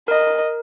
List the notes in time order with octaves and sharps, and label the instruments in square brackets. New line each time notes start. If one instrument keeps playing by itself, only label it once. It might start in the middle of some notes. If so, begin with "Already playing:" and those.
[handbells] A#4 [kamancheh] D#5